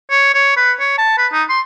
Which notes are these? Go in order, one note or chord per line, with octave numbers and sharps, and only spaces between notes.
C#5
C#5
B4
C#5
A5
B4
D#4
C6